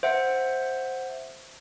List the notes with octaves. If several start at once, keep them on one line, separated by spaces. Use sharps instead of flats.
C5 E5 F#5